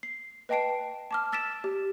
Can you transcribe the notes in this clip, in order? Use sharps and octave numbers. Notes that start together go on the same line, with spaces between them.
C7
B4 D#5 G5 A5 C7 D7
A5 D6 F6
E6 A6 B6 D7 E7
G4